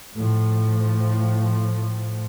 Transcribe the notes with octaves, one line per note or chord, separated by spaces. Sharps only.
A2 F3